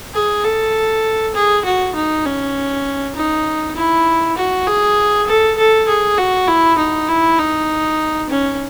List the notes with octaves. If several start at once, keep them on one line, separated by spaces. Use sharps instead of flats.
G#4
A4
G#4
F#4
D#4
C#4
D#4
E4
F#4
G#4
A4
A4
G#4
F#4
E4
D#4
E4
D#4
C#4